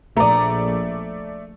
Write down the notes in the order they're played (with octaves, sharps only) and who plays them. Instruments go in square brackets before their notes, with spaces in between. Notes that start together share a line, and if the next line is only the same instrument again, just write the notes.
[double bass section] A#1 [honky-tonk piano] A3 D5 [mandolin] A#5 D#6